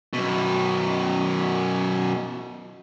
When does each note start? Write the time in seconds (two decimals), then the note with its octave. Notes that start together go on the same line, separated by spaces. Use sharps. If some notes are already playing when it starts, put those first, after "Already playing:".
0.13 F#2 B2